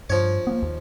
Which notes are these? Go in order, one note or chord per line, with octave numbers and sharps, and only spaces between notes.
G2 F3 C#5
A#3 B3
D#2